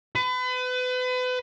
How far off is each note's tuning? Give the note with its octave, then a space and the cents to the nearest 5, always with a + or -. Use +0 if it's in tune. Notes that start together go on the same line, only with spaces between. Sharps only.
B4 +35